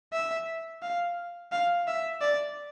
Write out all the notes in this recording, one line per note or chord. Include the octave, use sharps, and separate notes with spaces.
E5
F5
F5
E5
D5